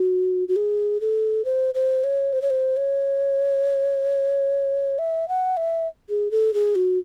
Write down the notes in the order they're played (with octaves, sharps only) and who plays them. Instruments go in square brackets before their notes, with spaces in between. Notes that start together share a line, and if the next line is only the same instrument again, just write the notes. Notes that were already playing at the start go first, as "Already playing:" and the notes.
Already playing: [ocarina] F#4
F#4
G#4
A4
C5
C5
C#5
C5
C#5
C5
C#5
E5
F#5
E5
G#4
A4
G#4
F#4